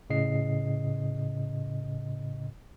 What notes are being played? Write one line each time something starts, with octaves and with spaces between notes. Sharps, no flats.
A2 C#3 D#5 C7